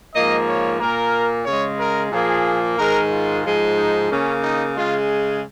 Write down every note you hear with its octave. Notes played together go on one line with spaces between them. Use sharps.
G#2 F3 A#3 D#5
C#5
A#2 A#3 A#4
C#3 G#3 C#5
A#4
A#2 F3 A#3 G#4
G#2 D#3 G#3 A#4
F4
G#2 F3 G#3
D#4
C#3 A#3 C#4
D#4
C#3 G#3 F4